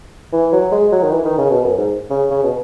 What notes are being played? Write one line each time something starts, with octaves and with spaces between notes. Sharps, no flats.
E3
F#3
G#3
F#3
D#3
E3
D#3
C#3
B2
F#2
G#2
C#3
C#3
B2